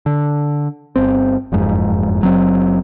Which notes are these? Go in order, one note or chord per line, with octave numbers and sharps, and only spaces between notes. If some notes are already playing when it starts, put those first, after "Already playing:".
D3
G1 C4
F#1 F2 G#2
F#1 F#3 C4